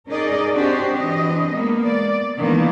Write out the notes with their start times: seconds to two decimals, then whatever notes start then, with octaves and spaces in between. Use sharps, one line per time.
0.11 C#4 D#4 G#4 A#4 D5 D#5
0.54 C4 D4 F#4 G4 C5
0.95 E3 C4 D4 D#5
1.52 G#3 A#3 B3
1.81 D5
2.39 D#3 E3 G#3 A#3 B3 D4